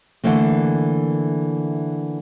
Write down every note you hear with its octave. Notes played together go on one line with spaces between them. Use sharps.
D3 E3 A3 A#3